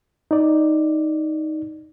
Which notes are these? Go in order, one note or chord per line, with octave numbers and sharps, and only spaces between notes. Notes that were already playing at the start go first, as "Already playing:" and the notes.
D#4 D5